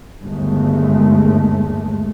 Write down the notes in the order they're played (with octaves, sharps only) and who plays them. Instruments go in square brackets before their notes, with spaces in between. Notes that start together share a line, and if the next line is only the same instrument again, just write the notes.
[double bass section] G1 D#2 G#3 A3